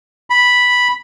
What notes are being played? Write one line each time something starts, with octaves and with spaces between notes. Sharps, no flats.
B5